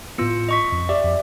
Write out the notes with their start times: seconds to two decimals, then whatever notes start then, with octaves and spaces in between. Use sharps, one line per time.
0.18 A2 B3 F4 E6 C#7
0.49 D#5 C#6 B6
0.72 F2
0.89 G4 D5 E5
1.04 F2